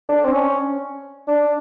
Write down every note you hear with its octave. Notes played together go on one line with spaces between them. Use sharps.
D4
C4
C#4
D4